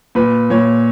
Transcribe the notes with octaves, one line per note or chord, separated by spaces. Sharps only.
A#2 B4
A#2 C#5